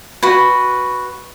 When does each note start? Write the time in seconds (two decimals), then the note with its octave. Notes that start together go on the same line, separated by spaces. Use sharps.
0.23 F#4 B4